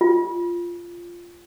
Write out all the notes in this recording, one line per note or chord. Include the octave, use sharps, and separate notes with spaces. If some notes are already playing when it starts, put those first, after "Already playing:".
F4